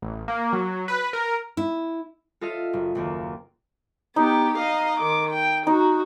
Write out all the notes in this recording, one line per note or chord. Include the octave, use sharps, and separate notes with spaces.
A1
A#3
F#3
B4
A#4
E4
F4 A4 D#5 E5 F6
F#1
F#1 D#2 A#3
B3 D#4 G4
D#5 F5
D#3 D6
G5
D#4 F#4